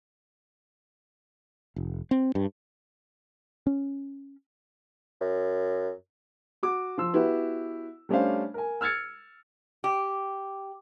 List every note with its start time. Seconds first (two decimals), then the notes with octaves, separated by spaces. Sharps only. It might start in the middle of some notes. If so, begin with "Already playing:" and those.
1.76 F1
2.11 C4
2.35 G2
3.67 C#4
5.20 F#2
6.63 F#4 D6
6.98 F3 C6 E6
7.13 B3 E4 F#4 G4 B4
8.09 G3 A3 C#4 D4 C5 F5
8.54 A#4 G#5
8.81 E6 F6 G#6 A6 C#7
9.84 G4